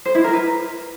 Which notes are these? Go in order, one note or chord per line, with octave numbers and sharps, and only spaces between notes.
C5
E4
A#4
B4